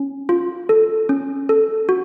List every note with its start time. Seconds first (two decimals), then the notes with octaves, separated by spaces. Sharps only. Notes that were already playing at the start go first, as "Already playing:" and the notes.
Already playing: C#4
0.29 F4
0.69 A4
1.09 C#4
1.49 A4
1.89 F#4